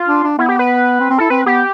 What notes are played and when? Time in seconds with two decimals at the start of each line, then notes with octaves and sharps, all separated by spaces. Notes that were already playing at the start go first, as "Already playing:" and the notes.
Already playing: F4
0.09 D4
0.24 D4
0.38 B3 E4
0.49 G4
0.59 B4
1.00 C4
1.10 C4
1.18 E4 A4
1.30 C4 B4
1.46 B3 G4